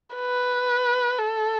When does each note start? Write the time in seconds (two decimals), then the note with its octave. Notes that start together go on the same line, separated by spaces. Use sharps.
0.16 B4
1.19 A4